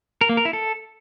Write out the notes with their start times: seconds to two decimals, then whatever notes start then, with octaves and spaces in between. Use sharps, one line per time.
0.21 A#4
0.29 A#3
0.37 A#4
0.45 E4
0.53 A4